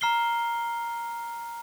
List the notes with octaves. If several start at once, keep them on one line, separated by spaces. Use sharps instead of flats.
A#5 F6 C7 G7